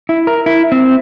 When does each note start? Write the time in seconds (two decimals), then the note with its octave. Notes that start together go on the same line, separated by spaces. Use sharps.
0.09 E4
0.27 A#4
0.46 E4
0.72 C4